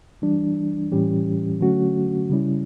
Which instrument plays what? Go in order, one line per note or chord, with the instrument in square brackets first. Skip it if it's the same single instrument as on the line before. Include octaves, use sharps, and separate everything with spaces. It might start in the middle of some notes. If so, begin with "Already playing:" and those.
[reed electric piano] E3 G3 D4
A2 E3 G3 C#4 G4
D3 F#3 A3 C#4 F#4
C#3 G3 C#4 E4